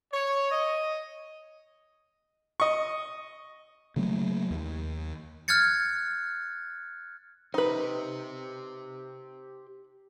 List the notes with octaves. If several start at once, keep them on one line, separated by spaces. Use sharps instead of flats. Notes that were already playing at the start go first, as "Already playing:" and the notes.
C#5
D#5
D#5 C#6
C#3 F#3 A3 A#3
D#2
F6 F#6 G#6 A6 C#7
D#4 G4 B4 C5